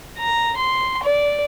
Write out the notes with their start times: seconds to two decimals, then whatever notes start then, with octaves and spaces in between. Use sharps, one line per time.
0.18 A#5
0.57 C6
1.03 D5